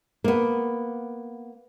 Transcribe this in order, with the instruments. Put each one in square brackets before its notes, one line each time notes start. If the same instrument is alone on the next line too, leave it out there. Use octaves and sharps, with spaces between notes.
[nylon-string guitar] A#3 B3